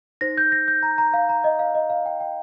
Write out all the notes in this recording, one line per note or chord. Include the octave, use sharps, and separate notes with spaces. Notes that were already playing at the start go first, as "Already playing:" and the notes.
D#4 C5 A#6
G6
A#6
G6
A#5
A#5
F5
A#5
D#5
F5
D#5
F5
G5
G5